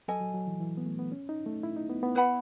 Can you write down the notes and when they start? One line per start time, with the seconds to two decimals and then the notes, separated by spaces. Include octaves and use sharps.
0.08 F#3 A4 D#5 G#5
0.21 F#3
0.34 F#3
0.47 E3
0.60 E3
0.77 B3
0.86 A3
0.99 B3
1.12 C#4
1.29 D#4
1.46 A3
1.63 E4
1.76 D#4
1.89 B3
2.03 B3
2.15 E4 B4 F#5 B5